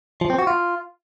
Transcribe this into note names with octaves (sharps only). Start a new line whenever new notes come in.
F3
C4
F#4
F4